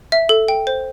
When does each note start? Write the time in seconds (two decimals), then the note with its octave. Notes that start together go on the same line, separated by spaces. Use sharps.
0.12 E5
0.29 A4
0.48 G5
0.67 C5